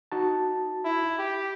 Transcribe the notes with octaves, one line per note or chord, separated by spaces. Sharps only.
D#4 F#4 A5
E4
G4